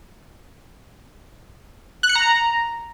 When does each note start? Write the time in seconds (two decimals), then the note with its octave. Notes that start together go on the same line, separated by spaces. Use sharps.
2.03 F#6
2.09 C#7
2.15 A#5